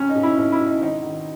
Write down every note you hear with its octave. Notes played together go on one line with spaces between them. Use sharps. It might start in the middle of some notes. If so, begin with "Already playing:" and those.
Already playing: C#2 C#4
D#4
B2
E4
B2 D#4
E4
B2
D#4
G#1 D#4
D#3